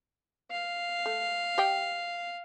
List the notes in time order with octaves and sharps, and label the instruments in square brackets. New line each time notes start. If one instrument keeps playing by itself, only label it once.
[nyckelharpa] F5
[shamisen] A3
G4 D#5 G5